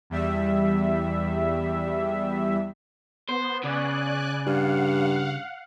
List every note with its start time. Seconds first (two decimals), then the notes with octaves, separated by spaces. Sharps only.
0.10 E2 G3 E5
3.29 B3 C5
3.63 C#3 D5 G#5 F#6
4.46 G2 F5 F#5